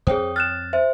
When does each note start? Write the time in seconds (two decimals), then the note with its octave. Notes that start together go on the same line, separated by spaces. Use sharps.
0.07 F2 C4 G#4 C5 C#5 G5 D#6
0.36 F6 F#6 A6 E7
0.73 C5 E5